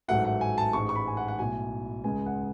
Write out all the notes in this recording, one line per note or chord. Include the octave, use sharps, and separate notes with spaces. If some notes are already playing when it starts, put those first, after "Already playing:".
A1 G#2 F#3 A3 F#5
F#5
G#5
A5
A1 G#2 G#3 C#6
C#6
B5
G#5
F#5
F#5
B1 A2 F#3 G#5
C#2 C#3 G#3 G#5
F#5